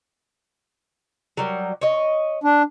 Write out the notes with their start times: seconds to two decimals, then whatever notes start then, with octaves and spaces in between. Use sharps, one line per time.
1.37 F#3 G3 A#4
1.81 C#5 D#5
2.44 D4